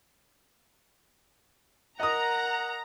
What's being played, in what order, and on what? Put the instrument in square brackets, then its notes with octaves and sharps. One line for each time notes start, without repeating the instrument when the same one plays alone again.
[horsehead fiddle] A#4 [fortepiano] D#5 D#6 [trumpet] F#5 [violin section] A#5